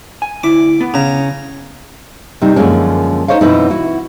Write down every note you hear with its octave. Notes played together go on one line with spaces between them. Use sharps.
G#5
D2 E4 D6
B3
C#3 A#5
C3 G3 D#4
F#2 D3 F3 G#3 A#3 C#4
D#4 C5 C#5 D#5 F5
F#2 B2 E3 C4 D#4
E4 F#4